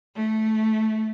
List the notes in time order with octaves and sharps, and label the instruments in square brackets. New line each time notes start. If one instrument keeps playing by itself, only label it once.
[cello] A3